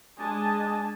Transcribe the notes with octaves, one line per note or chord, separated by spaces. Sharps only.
G#3 D4 D#5 G#5 A5